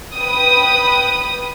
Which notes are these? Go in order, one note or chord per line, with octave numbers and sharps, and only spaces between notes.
B4 G5 D#6